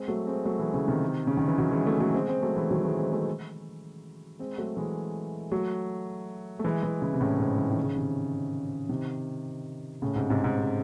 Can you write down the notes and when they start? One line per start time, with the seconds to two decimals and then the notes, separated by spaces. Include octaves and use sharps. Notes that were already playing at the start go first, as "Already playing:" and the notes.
Already playing: G#3 C4
0.08 F#3 A3
0.27 G#3 C4
0.45 F#3 A3
0.59 E3 G#3
0.74 C#3 E3
0.88 C3 D#3
1.27 C#3
1.37 D#3
1.48 E3
1.58 D#3 F#3
1.72 E3 G#3
1.86 F#3 A3
2.00 F#3 A3
2.14 G#3 C4
2.28 G#3 C4
2.42 F#3 A3
2.56 E3 G#3
2.71 D#3 F#3
2.84 E3 G#3
2.98 G#3 C4
3.13 F#3 A3
4.39 G#3 C4
4.58 F#3 A3
4.77 E3 G#3
5.52 F#3 A3
6.59 A3
6.64 E3 G#3
6.83 E3 G#3
7.02 C#3 E3
7.13 C3
7.21 A2 C#3
7.39 G#2 C3
7.58 E3
7.71 D#3
7.83 C#3
7.96 C3 D#3
8.89 C3 D#3
10.02 A2 C#3
10.16 G#2 C3
10.30 G#2 C3
10.44 G#2
10.58 C3